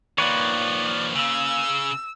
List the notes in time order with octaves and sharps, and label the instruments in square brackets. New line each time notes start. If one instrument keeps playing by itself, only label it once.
[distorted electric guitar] D#3 F3 [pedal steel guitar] A#3 B4 C#5 [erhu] D5
[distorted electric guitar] C#3 [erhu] E6